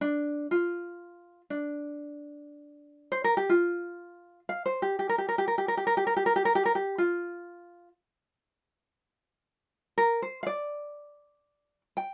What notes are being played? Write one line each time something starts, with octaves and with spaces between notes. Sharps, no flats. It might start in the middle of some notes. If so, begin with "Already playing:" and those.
D4
F4
D4
C5
A#4
G4
F4
F5
C5
G4
G4
A#4
G4
A#4
G4
A#4
G4
A#4
G4
A#4
G4
A#4
G4
A#4
G4
A#4
G4
A#4
G4
F4
A#4
C5
F5
D5
G5